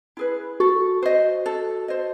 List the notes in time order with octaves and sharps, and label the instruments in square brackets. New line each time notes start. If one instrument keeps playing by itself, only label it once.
[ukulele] E4 G#4 B4
[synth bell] F#4 [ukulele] A4
[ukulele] C5 D#5
A4
C5 D#5